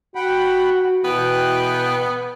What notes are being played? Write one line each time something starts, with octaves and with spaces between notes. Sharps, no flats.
F#4 F#5 G5 B5
B2 E3 B3 G5 F#6